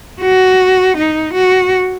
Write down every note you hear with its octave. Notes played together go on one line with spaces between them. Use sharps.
F#4
D#4
F#4